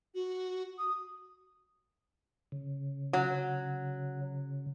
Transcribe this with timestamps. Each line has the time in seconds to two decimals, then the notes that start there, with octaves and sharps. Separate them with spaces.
0.15 F#4
0.78 D#6
2.52 C#3
3.13 F#3